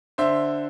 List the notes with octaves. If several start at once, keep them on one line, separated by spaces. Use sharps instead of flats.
D3 C5 E5